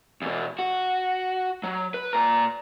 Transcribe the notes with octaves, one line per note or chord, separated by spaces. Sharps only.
E2 B2
F#4
F#3
B4
A#2 A#5